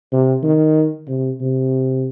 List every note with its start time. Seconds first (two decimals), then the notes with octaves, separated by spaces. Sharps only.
0.12 C3
0.43 D#3
1.08 C3
1.41 C3